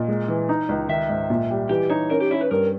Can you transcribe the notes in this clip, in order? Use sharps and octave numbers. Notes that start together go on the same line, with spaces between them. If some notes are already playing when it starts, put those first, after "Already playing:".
Already playing: A#2 D#5
G#3
E3
D#4
C#2
D#3 E5
G#2
A#2
G3
E3 G4
D#4 C#5
C#4 A#4
G4
C#4 E4
B4
G2 A#4